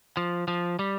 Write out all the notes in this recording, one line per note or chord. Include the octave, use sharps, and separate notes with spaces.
F3
F3
G3